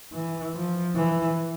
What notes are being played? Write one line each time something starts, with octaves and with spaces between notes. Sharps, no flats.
E3
F3
E3